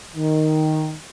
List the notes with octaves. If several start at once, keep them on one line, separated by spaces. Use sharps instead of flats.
D#3